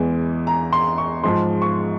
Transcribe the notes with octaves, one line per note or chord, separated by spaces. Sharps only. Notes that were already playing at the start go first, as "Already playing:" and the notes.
Already playing: E2 E3 G#3
A#5
C6
C#6
G#2 F3 G#3 C6
C#6